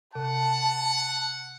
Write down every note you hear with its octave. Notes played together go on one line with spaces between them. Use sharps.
C3 F#5 A5